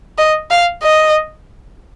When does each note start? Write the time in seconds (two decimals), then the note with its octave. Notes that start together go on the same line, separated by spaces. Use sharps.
0.18 D#5
0.51 F5
0.83 D#5